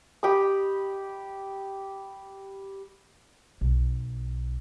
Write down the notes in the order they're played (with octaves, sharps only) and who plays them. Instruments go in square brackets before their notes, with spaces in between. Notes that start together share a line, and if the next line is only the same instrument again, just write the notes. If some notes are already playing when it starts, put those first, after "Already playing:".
[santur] G4 G5 B5 D#6
[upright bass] B1